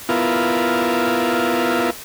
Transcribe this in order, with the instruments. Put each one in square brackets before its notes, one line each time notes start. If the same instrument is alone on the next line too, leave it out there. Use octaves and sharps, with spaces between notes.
[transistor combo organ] B3 E4 F4 A#4